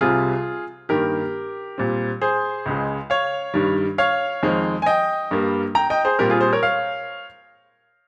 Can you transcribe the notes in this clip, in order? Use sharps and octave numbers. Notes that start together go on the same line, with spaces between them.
C2 C3 G3 F4 G#4
G2 D#3 A#3 G4 A#4
A#2 G3 C4
G#4 C5
C#2 C#3 G#3
C#5 F5
G2 D#3 G3
C#5 F5
F2 D#3 G#3 C4
G#5
D#5 G5
G2 G3 A#3
G5 A#5
D#5 G5
G#4 C5
A#2 G3 C4 G4 A#4
F4 G#4
G#4 C5
A#4 C#5
C#5 F5